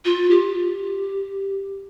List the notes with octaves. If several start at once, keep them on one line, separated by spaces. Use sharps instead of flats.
F4
G4